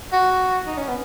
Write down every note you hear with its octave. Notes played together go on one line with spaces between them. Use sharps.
F#4
D#4
C#4
B3